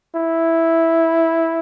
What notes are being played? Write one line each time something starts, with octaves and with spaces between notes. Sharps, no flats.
E4